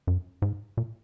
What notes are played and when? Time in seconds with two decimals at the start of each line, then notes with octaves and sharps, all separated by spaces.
0.07 F#2
0.42 G#2
0.77 A#2